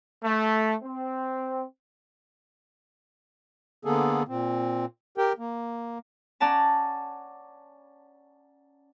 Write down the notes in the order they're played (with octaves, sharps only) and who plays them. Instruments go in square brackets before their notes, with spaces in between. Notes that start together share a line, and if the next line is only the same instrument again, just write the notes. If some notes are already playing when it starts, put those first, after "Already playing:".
[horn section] A3
C4
[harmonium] D3 A#3 B3 G#4 A4
A#2 C4
G4 A#4 G5
A#3
[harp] C#4 D5 F#5 A5 A#5